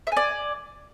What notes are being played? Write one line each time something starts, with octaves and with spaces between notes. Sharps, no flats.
D5 E5 G#5